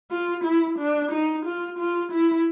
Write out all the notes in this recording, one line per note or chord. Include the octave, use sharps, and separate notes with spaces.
F4
E4
D4
D#4
F4
F4
E4